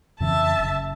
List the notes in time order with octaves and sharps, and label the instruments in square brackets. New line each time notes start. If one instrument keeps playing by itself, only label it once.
[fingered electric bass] F2 C#3 E3 [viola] E5 A5
[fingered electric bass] F#1 C#3